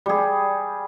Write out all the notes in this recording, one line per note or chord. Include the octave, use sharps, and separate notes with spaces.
G3 G#4